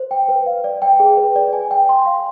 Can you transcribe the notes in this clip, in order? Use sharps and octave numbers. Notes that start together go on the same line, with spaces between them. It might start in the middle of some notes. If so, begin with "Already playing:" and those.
Already playing: C5
G5
B4
F5
D5
G5
G#4
B4
D5
G#5
G5
C6
F5